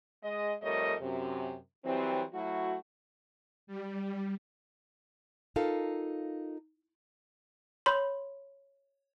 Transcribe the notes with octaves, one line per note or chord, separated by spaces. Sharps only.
G#3 D#5
F2 G3 A3 A#4 C#5 D#5
F#2 C3
E3 F#3 G3 C4
F#3 A3 E4 F#4
G3
D#4 F4 A4 A#4 F5
C#5 B5 C6